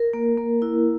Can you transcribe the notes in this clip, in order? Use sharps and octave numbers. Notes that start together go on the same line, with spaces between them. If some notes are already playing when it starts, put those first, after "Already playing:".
Already playing: A#4
A#3
A#3
E4